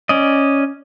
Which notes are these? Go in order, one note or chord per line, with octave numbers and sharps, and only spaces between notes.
C#4 D5 D#5